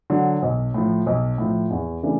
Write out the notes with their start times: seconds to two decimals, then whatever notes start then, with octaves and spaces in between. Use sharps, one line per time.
0.10 D3 F#3
0.42 B1
0.74 A2 F3
1.07 B1
1.38 A2 F3
1.71 E2
2.03 C#3 E3 A3 D4